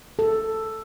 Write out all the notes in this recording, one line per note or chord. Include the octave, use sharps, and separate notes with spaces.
A4